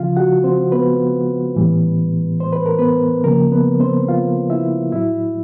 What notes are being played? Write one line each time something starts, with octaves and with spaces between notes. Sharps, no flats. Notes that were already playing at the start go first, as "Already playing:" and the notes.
Already playing: C#3 F3 F4 F5
F#4 F#5
C4 C5
B3 B4
A2 E3 G3
C5
B4
A#4
B3 B4
C#3 F3 A#3 A#4
B3 B4
C4 C5
F4 F5
E4 E5
A2 F#3 E4 E5